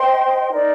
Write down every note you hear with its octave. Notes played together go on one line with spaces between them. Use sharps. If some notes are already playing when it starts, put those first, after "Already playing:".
Already playing: C5 D#5 G5 C6
D#4 A#4 D5